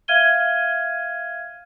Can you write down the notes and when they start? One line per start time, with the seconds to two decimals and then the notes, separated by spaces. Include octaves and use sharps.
0.08 E5 F5 F6 G#6 D#7 G7